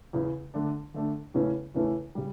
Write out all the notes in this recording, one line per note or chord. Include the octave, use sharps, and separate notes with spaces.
E2 C#3 E3
D3 A3 D4
D3 A3 D4
E2 C#3 E3 A3 C#4
E2 C#3 E3 A3 C#4
C#3 G3